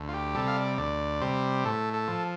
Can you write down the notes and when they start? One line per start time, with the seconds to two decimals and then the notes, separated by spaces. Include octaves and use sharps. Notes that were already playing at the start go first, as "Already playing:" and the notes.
Already playing: D2
0.08 F4
0.13 G4
0.35 C3 G3 A4
0.48 F5
0.57 D5
0.78 D2 D5
1.21 C3 G3 C5
1.65 A2 A4
1.93 A4
2.08 F3